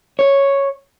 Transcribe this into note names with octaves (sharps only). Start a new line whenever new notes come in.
C#5